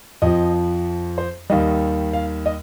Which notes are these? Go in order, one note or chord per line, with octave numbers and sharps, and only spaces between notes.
F2 F3 D#5
C5
D#2 D#3 G3 D#5
F5
D#5